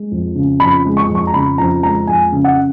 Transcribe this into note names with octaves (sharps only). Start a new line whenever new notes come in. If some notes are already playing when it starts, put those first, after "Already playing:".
Already playing: G#3
F2
C#3
F2 B5
G#3
C#6
F2
C#6
A#5
C#3 B5
F2 A#5
G#3 A#5
F2 G#5
C#3
F#5